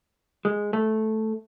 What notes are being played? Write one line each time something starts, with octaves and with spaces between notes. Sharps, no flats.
G#3
A3